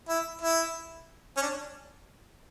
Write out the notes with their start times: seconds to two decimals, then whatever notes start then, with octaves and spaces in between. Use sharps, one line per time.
0.09 E4
0.41 E4
1.37 C#4
1.42 D4